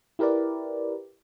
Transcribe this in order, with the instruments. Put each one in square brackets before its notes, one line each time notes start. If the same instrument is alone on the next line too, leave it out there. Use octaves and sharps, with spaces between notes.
[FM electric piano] E4 G4 A#4 B4 D5